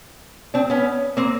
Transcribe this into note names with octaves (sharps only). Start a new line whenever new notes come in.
C4 D4
B3 C#4
A#3 C4